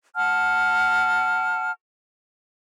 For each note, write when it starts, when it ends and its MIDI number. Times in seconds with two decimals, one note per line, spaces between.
0.15 1.71 78
0.15 1.71 81
0.15 1.71 89